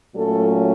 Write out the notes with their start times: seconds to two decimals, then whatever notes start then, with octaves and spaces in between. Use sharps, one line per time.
0.15 A#2 F#3 A3 C#4 A4